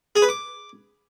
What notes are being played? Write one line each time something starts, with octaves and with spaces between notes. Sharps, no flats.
G#4
B4
D6